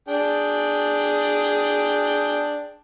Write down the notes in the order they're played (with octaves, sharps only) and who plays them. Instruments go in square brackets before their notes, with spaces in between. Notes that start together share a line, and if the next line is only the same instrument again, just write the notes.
[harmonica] D4 G#4 G5